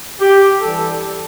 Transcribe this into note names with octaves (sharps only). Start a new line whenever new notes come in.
G4
E3 G3 D4 A4